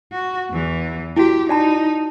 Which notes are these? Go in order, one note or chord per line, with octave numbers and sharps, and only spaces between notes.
F#4
E2 E3
E4 F#4 G4
D#4 D5 A5 B5